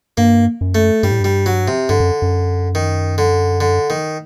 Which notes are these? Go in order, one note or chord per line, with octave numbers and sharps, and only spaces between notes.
G2 A#3
F#2
A3
G2 G3
A2
G2 G3
F#3
C3
G2 D3
F#2
F#2
D#3
D3
D3
D#3